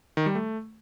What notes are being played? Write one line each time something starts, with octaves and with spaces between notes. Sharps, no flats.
D#3
G3
A3